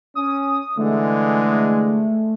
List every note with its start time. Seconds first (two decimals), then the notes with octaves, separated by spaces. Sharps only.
0.15 C#4 D#6
0.78 D3 E3 G#3 A3